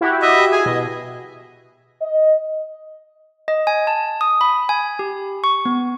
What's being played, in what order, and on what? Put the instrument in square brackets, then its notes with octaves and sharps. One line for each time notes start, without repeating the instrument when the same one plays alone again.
[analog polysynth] E4 F#4 G4
[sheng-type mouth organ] D#5 E5
G#4 G#5
[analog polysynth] B2 [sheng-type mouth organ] D#5
[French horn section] D#5
[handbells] D#5
G#5
A5
D#6
B5
G#5
G4
C#6
B3